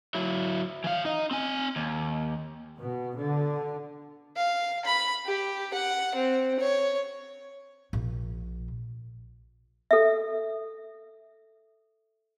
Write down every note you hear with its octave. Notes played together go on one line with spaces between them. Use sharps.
F#3 E4
E3 F5
D#4 D#5
C4 G#5
D#2
B2
D3
F5
B5
G4
F#5
C4
C#5
A#1
A4 E5